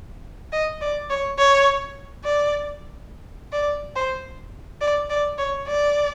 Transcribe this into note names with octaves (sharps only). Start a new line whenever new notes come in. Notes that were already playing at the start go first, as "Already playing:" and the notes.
D#5
D5
C#5
C#5
D5
D5
C5
D5
D5
C#5
D5